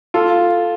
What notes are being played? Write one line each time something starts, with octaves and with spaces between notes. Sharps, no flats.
F4 A4